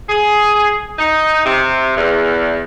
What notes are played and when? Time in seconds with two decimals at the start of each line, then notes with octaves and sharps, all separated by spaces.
0.10 G#4
0.99 D#4
1.45 C3
1.96 E2